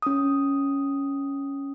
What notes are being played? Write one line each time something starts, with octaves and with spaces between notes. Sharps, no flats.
C#4 D#6